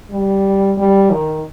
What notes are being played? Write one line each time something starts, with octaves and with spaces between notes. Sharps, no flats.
G3
G3
D#3